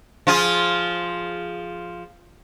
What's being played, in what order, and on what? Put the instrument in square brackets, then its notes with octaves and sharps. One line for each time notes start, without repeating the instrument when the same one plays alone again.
[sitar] F3 F4 G#4